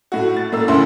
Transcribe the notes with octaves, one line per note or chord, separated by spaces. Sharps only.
A2 F#4
A6
A2 A#3 E6
F#1 D2 C#4 E4 C6